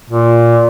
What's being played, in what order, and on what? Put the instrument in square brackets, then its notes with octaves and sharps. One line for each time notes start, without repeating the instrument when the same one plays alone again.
[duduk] A#2